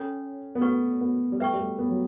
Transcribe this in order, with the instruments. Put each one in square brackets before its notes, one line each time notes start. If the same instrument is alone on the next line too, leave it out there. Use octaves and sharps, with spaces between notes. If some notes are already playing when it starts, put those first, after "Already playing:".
Already playing: [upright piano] C#4 [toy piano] A4 C#5 G5 B5
[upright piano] B3
[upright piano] A3 [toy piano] B4 F#5 C#6
[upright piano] B3
G3
[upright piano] A3 [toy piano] B4 E5 G5 C#6
[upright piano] G3
A3
B3
F#3